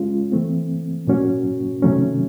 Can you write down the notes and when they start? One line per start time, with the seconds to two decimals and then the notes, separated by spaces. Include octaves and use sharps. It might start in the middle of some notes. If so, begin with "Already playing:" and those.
Already playing: G#3 C#4 F4
0.32 E3 A3 C4
1.07 A#2 F#3 A#3 C#4 F#4
1.83 C3 D#3 F#3 A3 C#4